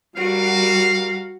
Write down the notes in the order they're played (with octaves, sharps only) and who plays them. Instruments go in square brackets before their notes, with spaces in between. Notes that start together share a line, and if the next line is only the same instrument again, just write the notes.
[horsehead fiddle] G3 A#4 [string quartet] F#4 [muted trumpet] F5